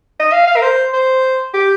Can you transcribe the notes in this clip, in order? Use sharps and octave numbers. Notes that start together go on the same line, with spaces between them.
D#5
F5
F5
A#4
C5
C5
G4